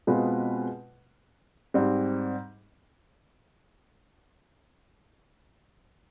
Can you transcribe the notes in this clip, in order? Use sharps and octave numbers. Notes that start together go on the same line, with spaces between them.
B2 G#3 C4 F4 B4
G#2 G3 C4